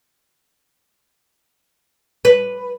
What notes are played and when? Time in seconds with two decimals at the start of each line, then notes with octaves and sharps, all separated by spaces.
2.25 B4